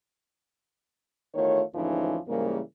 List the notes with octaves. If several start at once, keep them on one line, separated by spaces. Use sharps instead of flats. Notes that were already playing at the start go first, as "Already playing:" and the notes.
E2 D#3 A3 F4 C#5
D2 G#2 E3 F3 C#4 D#4
G#2 C#3 E3 G3 A#3